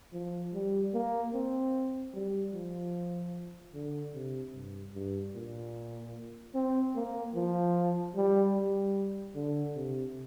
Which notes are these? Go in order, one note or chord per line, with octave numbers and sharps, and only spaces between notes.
F3
G3
A#3
C4
G3
F3
D3
C3
G2
G2
A#2
C4
A#3
F3
G3
G3
D3
C3